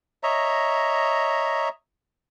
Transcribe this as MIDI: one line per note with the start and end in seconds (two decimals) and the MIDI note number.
0.23 1.69 73
0.23 1.69 75
0.23 1.69 76
0.23 1.69 82